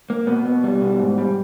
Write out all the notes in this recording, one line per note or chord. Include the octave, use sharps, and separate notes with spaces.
A#3
B2 B3
B3
G3
B2
G#2
G3